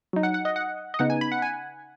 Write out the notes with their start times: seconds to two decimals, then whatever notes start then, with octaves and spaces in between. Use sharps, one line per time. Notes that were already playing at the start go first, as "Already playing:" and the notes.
0.13 F#3 D#4
0.23 F#5
0.34 F#5
0.45 D#5
0.56 F#5
0.94 D#5
0.99 C#3 B3 D#4 F#5
1.10 G#5
1.21 B5
1.32 F#5
1.42 G#5